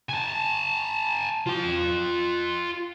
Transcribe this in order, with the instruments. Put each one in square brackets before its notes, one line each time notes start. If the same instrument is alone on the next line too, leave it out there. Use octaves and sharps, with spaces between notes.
[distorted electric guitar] G#5 A5
F4 G5